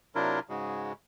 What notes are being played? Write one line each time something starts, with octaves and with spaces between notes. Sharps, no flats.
C3 F#3 D4 E4 F4 A#4
G#2 C#3 G#3 F#4